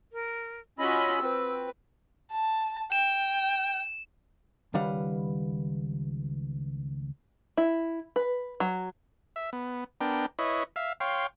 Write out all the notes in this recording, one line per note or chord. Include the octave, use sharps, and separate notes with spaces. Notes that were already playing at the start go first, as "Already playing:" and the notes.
A#4
C#4 F4 F#4 D#5 B5 E6
C4 B4
A5
G5 E7
C#2 D#3 G3 B4 F5 F#5
E4
B4
F#3
E5
B3
B3 D4 A#4 G5
E4 B4 C#5 D#5
E5 F5
C#5 F5 G5 C6